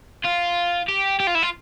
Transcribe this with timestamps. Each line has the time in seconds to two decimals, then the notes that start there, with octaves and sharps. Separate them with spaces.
0.25 F4
0.89 G4
1.20 G4
1.27 F4
1.35 E4
1.43 F4